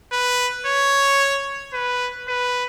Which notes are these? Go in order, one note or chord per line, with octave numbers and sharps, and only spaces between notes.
B4
C#5
B4
B4